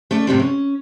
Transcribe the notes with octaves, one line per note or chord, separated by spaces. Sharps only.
A3 C#4 D5
A2 C3 G3 C4
C#4